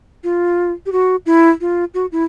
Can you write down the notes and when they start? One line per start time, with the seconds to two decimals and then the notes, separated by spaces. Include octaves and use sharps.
0.24 F4
0.86 G4
0.92 F#4
1.26 E4
1.61 F4
1.94 F#4
2.12 E4